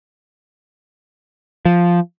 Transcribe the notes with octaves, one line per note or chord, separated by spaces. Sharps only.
F3